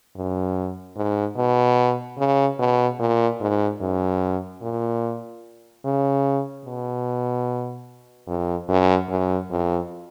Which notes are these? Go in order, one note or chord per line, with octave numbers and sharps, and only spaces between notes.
F#2
G#2
B2
C#3
B2
A#2
G#2
F#2
A#2
C#3
B2
F2
F#2
F#2
F2